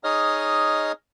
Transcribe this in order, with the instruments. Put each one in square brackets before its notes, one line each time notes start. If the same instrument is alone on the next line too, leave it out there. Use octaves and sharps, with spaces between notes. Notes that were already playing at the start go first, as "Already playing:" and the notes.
[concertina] D#4 G#4 C#5 D#5 D#6 F6